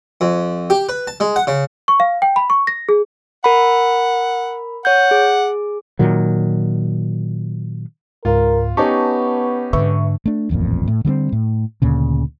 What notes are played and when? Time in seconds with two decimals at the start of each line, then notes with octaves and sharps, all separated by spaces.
0.21 F2
0.70 G4
0.89 B4
1.07 A5
1.20 G#3
1.36 F#5
1.47 C#3
1.88 C#6
2.00 F5
2.22 G5
2.36 B5
2.50 C#6
2.67 A#6
2.89 G#4
3.44 A#4 F#5 B5
4.85 C#5 F#5 G6
5.11 G#4
5.99 A#2 D#3 F#3
8.25 C#2 G#2 F4 A#4
8.77 B3 C#4 D#4 G4 A5 C#6
9.73 G#2 D3 B4 E5 C#6
10.26 A3 D4
10.50 D#1 A1 F2 A#2
10.88 A2
11.05 D3 G3 A3 C4
11.33 A2
11.82 D2 A#2 C#3